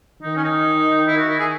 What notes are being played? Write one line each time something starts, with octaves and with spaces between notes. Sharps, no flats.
D#3 D#4
C#4
D#4
E4
F#4
E4
G#4